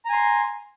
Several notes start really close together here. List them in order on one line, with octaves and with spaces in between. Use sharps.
A#5 G#5 C6